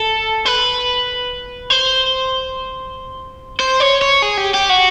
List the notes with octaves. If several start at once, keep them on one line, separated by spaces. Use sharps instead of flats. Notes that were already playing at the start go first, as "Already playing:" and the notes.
Already playing: A4
B4
C5
C5
C#5
C#5
G#4
G4
G4
F#4